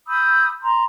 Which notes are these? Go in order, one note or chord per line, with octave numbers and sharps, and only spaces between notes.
B5 D#6 E6 G6
A#5 C6